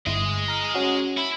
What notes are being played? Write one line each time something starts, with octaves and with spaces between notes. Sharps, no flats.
G1 E4 G#4 D#5
A#5 F6
C#4 F#4
E4